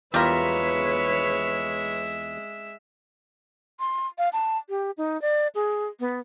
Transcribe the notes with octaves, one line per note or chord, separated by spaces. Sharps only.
E2 G3 G#3 F4 A#4 B4 C#5 E5
C6
F5
A5
G4
D#4
D5
G#4
B3